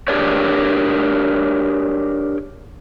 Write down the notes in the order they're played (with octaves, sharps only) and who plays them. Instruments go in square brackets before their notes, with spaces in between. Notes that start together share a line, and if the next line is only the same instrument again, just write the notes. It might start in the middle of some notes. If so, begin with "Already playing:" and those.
[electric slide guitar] D4 G4 G#4 A#4 C#5 D5